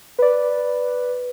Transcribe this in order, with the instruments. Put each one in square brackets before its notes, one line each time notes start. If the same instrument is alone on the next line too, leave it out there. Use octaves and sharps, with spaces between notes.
[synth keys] B4 D5